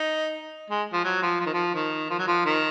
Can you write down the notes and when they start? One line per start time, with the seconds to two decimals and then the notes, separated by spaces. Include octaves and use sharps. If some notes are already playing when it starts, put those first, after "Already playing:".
Already playing: D#4
0.70 G#3
0.92 F3
1.04 F#3
1.22 F3
1.40 F3
1.46 D#3
1.54 F3
1.75 D#3
2.10 F3
2.19 F#3
2.27 F3
2.46 D#3